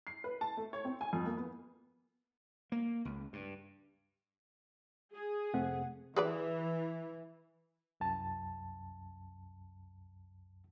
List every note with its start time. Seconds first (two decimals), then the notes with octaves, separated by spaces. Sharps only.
0.07 C7
0.24 B4
0.41 A5
0.57 A3
0.73 C#5
0.85 C4
1.01 G#5
1.13 F2
1.26 A#3
1.37 B3
2.72 A#3
3.05 C#2
3.33 G2
5.13 G#4
5.54 F2 C3 A3 C4 F#5
6.16 E3 G#4 B4 D5
8.00 C2 F#2 A5